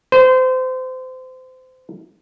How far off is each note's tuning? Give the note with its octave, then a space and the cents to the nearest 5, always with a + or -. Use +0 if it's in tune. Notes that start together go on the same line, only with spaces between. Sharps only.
C5 -30